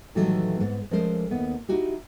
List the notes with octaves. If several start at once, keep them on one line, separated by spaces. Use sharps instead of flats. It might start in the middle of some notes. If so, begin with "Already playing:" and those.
A2 D#3 E3 F#3 G3 A3
G#2 B3
F3 G#3 A3 C#4 A#4 C5
D#2 B3
D#4 E4 F#4 G4